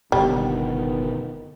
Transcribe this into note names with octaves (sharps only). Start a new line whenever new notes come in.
F#1 B2 D3 D#3 G3 B3